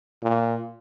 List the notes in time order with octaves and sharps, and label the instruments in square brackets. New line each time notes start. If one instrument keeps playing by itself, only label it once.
[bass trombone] A#2